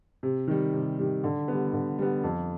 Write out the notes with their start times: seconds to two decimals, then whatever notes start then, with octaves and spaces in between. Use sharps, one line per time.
0.23 C3
0.48 D#3 G3
0.73 C3
0.99 D#3 G3
1.24 D3
1.48 G3 B3
1.73 D3
1.99 G3 B3
2.23 F2